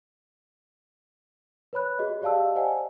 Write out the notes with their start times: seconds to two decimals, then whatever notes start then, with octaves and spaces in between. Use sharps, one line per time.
1.73 B4 C#5 B5 F#6
1.99 F#4 G#4 D#5
2.22 G4 D5 F5 A5 E6
2.55 C5 D5 D#5 F#5 G#5